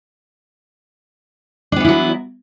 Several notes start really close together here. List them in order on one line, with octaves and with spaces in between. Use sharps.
D4 B3 E3 E4 F#3